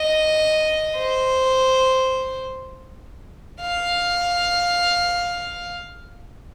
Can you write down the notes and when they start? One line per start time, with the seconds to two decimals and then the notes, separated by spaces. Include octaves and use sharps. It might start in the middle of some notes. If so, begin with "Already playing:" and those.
Already playing: D#5
0.96 C5
3.61 F5